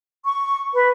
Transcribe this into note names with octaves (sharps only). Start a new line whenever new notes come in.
C#6
B4